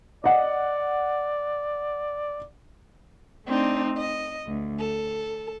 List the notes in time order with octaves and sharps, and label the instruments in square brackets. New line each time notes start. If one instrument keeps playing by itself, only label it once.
[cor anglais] D5 [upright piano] D#5 F#5
[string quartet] A3 C4 D4 D#4
D#5
D2
A4